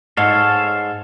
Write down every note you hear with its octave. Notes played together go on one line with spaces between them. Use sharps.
G#2 A4 C#5 F5